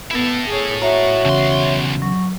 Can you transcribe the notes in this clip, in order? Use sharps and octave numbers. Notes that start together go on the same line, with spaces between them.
B3 E4 A4
G#4 C#5
F#4 C#5 E5 A#5
B1 E2 C#3 C6
F#3 C#6